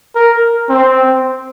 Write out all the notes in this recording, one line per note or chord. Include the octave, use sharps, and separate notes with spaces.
A#4
C4